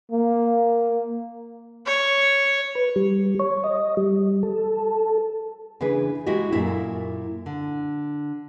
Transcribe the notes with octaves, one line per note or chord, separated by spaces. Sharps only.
A#3
C#5
B4
G3
C#5
D#5
G3
A4
C#3 E3 D4 G#4 B4
G#3 E4 F#4 G4 D#5
F#2 A#2 A3 E4
D3